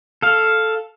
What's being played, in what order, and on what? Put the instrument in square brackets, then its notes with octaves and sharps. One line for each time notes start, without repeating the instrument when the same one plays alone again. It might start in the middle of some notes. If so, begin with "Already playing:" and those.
[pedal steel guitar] A4 F5